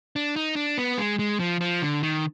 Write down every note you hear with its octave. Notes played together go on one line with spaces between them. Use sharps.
D4
D#4
D4
B3
G#3
G#3
F3
F3
D3
D#3